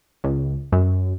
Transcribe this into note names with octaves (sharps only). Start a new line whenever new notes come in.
C#2
F#2